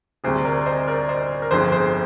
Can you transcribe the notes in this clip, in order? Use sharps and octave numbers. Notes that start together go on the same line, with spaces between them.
D2 C3 G3 G#4 C5
A#4 D5
C5 D#5
A#4 D5
C5 D#5
A#4
G1 F2 D3 G#4 C5
G#4 C5